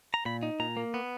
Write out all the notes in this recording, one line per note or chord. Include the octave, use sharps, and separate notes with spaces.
A#5
A#2 B5
D#4
A#2 A#5
A#3
B3